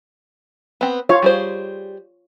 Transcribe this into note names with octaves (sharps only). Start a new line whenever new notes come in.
B3 C4
F4 C#5 F5
G3 G#4 C5